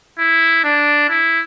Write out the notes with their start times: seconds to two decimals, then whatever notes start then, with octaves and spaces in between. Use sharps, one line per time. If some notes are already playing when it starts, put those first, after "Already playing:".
0.19 E4
0.64 D4
1.09 E4